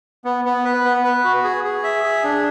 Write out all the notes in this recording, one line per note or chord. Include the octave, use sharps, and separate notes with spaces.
B3
B3
B4
B3
B4
F#4
G#4
G#4
E5
G#4
D4